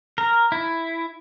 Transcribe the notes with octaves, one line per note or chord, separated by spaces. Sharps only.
A#4
E4